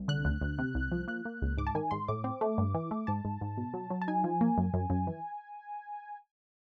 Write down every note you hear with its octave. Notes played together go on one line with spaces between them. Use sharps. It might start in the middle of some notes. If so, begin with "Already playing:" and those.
Already playing: C2
D3 F#6
D2
D2
C3
C2
F3
A#3 F#6
A#3
C#2
G#2 D6
A5
D#3 G#5
G#2 C6
A2 D6
C4
A3
G2
E3
A3
G#2 A5
G#2
G#2
B2
F#3
F#3
A5
D#4 G#5
F3
A#3
F#2
F#2
F#2
E3